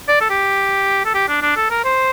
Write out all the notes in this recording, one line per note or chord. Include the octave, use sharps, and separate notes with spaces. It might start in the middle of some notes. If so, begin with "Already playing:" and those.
D5
A4
G4
A4
G4
D4
D4
A4
A#4
C5